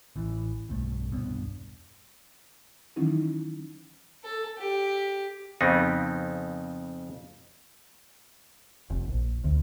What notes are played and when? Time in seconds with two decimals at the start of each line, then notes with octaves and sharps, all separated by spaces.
0.16 A1 E3
0.69 B1 G2 A3
1.11 E1 C2 G2 B3
2.96 D#3 E3 F#3 C#4 D#4 E4
4.24 A4
4.58 G4
5.61 F2 C#3 B3 C4 D#4
8.90 F1
9.08 A#1
9.44 D2